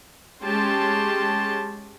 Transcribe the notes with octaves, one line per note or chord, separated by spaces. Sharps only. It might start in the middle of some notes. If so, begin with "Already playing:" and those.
G#3 C#4 G4 A5 C6